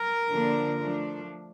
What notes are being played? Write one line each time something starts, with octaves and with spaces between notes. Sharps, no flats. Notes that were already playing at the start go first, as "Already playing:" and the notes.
Already playing: A#4
D3 F3 A#3 D4
F3 A3 D4